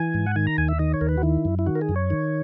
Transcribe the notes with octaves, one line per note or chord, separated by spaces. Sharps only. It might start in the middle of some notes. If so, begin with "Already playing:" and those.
Already playing: E3 G#5
G#2
F#5
D#3 G#5
A#5
D#2 G#5
E5
D#3 D#5
C#5
D#2 A#4
B4
F#4
D#3 E4
F#2
E4
D#3 F#4
A#4
G#4
F#2
C#5
D#3